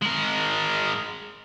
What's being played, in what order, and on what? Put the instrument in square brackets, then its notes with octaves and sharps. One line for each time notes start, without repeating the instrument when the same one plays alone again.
[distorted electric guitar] G#3 A#4